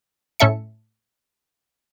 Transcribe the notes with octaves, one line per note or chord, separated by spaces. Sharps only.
A2 C#4 A4 E5 C#7